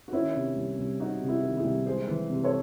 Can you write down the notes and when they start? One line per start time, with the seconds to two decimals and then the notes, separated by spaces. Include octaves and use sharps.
0.08 F#4
0.13 D#3 C#4 E4
0.35 C3
0.56 C2
0.78 C2
1.00 C3 D#4 F#4
1.22 C3
1.28 E4 G#4
1.43 D#3
1.57 E4 G#4
1.64 C2
1.86 G#3 G#4 C5
2.07 E3
2.30 C3
2.43 A4 C#5